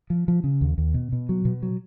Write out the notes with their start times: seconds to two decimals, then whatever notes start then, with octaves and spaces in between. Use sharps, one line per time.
0.10 F3
0.28 F3
0.44 C#3
0.61 D#2
0.78 D#2
0.94 B2
1.12 B2
1.29 F#3
1.45 B2
1.63 F#3